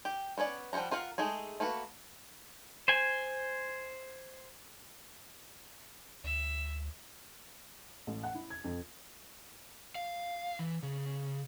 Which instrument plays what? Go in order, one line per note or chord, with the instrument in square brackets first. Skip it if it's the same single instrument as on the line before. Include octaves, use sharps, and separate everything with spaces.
[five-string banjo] G4
B3 C#4 C#5 D5
F3 G3 C5 F#5 A#5
F4 A#4 F5 F#5
G#3 A3 D#4 G#4
A3 A#3 F#4 B4
[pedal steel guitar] C5 G#5
[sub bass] D2 [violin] E5
[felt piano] A1
F#5
E4
G#6
F2
[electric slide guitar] F5
E3
C#3